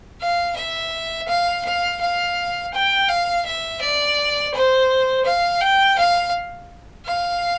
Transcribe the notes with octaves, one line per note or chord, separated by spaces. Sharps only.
F5
E5
F5
F5
F5
G5
F5
E5
D5
C5
F5
G5
F5
F5